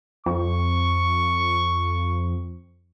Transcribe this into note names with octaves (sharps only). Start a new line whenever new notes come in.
F2 C#6